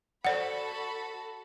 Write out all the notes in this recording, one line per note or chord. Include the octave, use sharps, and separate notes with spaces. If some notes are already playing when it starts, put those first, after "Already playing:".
F#4 A4 C5 D5 F#5 B5